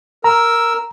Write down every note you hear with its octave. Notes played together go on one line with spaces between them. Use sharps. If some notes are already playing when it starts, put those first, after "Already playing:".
A#4 A#5 E6